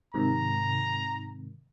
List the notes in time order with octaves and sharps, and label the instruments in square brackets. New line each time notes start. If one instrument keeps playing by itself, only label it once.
[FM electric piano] G#2 C3 D#3 [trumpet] A#5